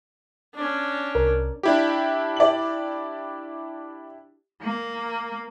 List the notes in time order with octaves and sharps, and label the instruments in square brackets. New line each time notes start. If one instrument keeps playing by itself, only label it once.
[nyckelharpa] C#4 D4
[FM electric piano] C2 A#4
[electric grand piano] D4 E4 G4
[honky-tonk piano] D5 F#7
[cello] A#3